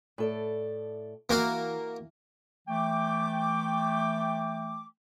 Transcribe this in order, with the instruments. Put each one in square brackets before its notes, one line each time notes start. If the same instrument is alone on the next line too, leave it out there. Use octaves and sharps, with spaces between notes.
[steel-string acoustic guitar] A2 A4 D5
[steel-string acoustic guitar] E3 [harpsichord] A#3 F#4 F5
[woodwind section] E3 A3 G5 D6